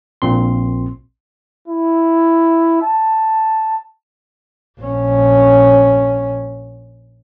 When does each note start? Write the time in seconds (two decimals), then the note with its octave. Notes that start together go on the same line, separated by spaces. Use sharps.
0.22 A#1 A#2 C4 C6
1.68 E4
2.82 A5
4.81 A#1 C#4